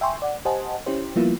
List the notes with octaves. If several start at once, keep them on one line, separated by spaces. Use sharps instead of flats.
E5 G5 G#5 C6 C#6
D5 F#5
G4 C5 D#5 F#5 G#5 A5
C#4 E4 G4 C5
F3 G3 A#3 B3 E4 F4